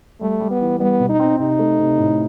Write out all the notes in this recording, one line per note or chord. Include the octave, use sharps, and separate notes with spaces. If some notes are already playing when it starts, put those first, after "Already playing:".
G3 A3
G3
B3
E3
G3 B3
B2
D#4
C4
C3 D#4
A3
C3
A2